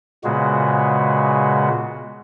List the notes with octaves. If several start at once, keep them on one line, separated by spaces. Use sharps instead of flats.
A#2 C#3 G#3 B3 F#4